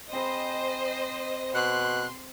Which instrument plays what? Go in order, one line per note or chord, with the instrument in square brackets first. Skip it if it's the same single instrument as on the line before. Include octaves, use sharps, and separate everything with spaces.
[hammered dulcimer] C4 G#4 B5 [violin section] C5 D#5
[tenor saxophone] B2 [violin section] C6 [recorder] F#6